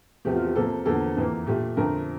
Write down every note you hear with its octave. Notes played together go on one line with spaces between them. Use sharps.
E2 C3 F3 A3 G4
F4
G4
C3 F3 A#3 A4
E2 D3 F3 A#3 A4
F2 E3 A#3
A#2 A3 G4
F2 D3 F3 A3 A#4